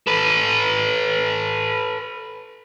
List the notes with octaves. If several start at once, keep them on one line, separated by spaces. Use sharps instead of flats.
A4 B4